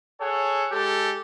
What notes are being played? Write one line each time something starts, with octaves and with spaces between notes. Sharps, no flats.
G#4 A4 C#5 F#5
G#3 G4 A4